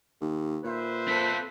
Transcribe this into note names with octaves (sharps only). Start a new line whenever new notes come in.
D#2
A#2 B4 C5 E5
C4 A4 B6